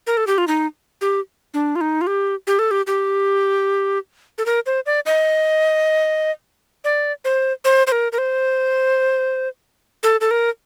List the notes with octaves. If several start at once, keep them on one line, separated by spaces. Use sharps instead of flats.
A#4
A4
G4
F4
D#4
G4
D4
F4
D#4
F4
G4
G4
A4
G4
G4
A4
A#4
C5
D5
D#5
D5
C5
C5
C5
A#4
A#4
C5
A4
A4
A#4